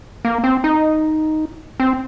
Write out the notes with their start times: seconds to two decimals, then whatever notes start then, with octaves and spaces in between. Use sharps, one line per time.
0.25 A#3
0.44 C4
0.64 D#4
1.80 C4